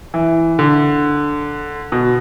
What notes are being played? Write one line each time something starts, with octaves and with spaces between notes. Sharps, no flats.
E3
D3
B2